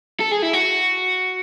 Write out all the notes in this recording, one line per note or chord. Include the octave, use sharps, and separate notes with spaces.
A4
G#4
E4
F#4